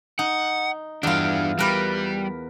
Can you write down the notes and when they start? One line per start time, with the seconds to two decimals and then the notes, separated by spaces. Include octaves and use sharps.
0.19 D#4 F#5
1.03 E2 G2 D4 F4
1.59 G3 A#4 B4 D5